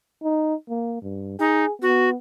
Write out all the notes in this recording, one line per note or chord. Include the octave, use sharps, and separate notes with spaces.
D#4
A#3
G2
D#4 G#4
B3 F#4